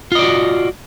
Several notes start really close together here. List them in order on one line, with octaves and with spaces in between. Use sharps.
F4 D#5 D5 F#4